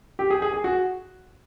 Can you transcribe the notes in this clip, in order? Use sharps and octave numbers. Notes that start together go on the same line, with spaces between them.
G4
G#4
G#4
G#4
F#4